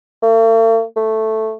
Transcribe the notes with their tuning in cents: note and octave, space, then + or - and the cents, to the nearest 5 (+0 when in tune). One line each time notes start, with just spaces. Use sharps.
A3 +45
A3 +0